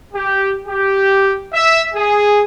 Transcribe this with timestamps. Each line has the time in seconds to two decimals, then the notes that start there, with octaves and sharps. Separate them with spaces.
0.14 G4
0.67 G4
1.54 E5
1.94 G#4